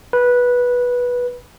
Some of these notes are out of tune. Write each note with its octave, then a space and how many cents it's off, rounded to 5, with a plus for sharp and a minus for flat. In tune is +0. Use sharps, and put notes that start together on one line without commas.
B4 -10